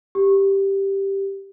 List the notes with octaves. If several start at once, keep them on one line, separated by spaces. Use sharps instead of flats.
G4